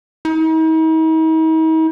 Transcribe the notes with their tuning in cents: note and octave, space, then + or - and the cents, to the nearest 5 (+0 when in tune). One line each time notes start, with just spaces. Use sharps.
D#4 +45